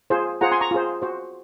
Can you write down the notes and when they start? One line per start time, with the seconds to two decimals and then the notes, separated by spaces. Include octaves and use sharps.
0.10 F4 G#4 C5
0.41 F4 G#4 C5 F#5 A#5
0.51 G#5 C6
0.61 A#5 C#6
0.71 F4 G#4 C5
1.02 F#4 C5